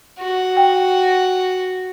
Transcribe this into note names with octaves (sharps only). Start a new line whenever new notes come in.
F#4
G5